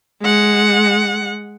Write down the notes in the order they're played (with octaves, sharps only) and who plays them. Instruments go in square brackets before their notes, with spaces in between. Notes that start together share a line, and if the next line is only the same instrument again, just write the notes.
[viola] G#3 F#5